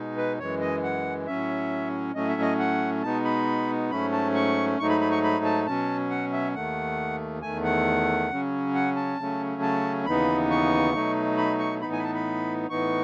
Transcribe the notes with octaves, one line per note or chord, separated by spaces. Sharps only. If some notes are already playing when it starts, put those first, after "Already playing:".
Already playing: B2 G#3 D#4
B4
F#2 E3 G#3 C#5
D#5
F#5
A2 F#3 C#4 E5
A2 F#3 A3 C#4 D#5
E5
D#5
F#5
B2 G#3 B3 D#4 A5
B5
G#2 F#3 A3 C#4 B5
A5
C#6
G#2 F#3 A3 D#4 C#6
B5
B5
C#6
B5
A5
B2 F#3 C#4 A5
F#5
E5
D#2 D#3 A3 F#5
E2 D#3 A3 G#5
F#5
C#3 F#3 C#4
F#5
A5
C#3 F#3 A3 C#4
A5
D#2 C#3 E3 B3 D#4 B5
C#6
B2 F#3 A3 D#4
B5
C#6
A2 E3 B3 D#4 B5
G#5
B5
A5
B5
A2 E3 B3 D#4 C#6